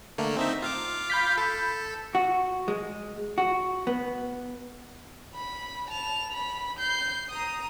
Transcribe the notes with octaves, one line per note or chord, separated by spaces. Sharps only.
D3 A3 A#3
C4 D#4 E5
F4 F5 D6
B5 G6 B6
A4
F#4
G#3
F#4
B3
B5
A5 F7
B5
G6 C7
A#5 D#6